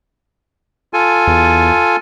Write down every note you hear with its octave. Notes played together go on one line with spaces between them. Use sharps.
F4 A4 G#5
E2